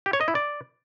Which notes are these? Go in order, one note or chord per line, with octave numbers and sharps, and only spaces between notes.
G4
C#5
D#5
E4
D5